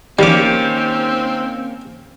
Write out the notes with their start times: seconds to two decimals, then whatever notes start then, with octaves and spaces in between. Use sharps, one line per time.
0.19 D#3 G3 A#3 C4 C#4 G4 D6